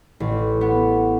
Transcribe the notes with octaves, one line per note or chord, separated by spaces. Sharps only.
A1
B3